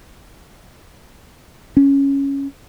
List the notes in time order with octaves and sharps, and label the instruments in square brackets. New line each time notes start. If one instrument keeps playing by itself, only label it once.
[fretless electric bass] C#4